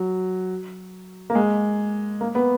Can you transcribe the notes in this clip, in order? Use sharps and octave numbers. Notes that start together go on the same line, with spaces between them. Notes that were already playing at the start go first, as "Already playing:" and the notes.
Already playing: F#3
A#3
G#3
A#3
B3